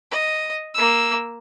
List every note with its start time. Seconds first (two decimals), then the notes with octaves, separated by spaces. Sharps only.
0.11 D#5
0.74 A#3 E6